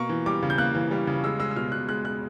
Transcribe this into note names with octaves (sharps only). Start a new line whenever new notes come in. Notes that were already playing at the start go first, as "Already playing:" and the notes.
Already playing: B2 A#3 C#6
E3
G3 D6
C#3
G6
A#3 F#6
E3
G3
C#3
G#3 E6
G#3 E6
E6
B2 F6
B2 F#6
G#3 F#6
G#3 F#6